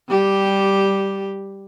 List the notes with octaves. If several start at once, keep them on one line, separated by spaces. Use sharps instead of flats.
G3 G4